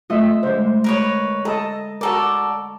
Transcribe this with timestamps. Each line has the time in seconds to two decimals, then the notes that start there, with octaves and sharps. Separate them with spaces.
0.10 A3 C4 F4 D#5 E5
0.43 D3 G#3 C5
0.84 A#4 B4 C#5
1.45 A4 D#5 A5 A#5
2.01 F#4 A4 A#4 D5 A5